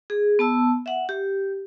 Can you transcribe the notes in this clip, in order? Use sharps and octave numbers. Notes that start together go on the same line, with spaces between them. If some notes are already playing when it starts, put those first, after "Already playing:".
G#4
B3 A5 E6
E5 F#5
G4